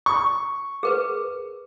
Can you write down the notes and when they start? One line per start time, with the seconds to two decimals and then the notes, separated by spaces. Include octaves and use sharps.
0.06 C#6
0.83 G#4 A#4 B4